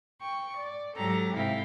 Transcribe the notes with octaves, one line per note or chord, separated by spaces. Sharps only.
G5 C#6
D5
G#2 F#3 G4 A4 A#5
G#2 C3 A3 E4 F5 G5